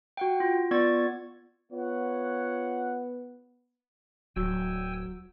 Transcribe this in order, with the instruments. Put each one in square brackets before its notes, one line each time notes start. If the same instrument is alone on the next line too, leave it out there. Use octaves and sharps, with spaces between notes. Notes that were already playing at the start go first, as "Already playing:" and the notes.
[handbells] F#4 F#5 G5
F4
B3 F4 D5 C#6 G#6 A6
[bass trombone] B3 [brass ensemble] F4 C#5 F#5
[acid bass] D1 [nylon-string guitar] F#3 [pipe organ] G5 G#5 E6